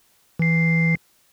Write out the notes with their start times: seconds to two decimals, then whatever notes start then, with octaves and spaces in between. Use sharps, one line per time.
0.39 E3 C7